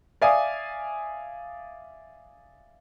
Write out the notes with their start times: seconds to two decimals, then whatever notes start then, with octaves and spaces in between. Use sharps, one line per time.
0.22 D5 E5 F5 G#5 D#6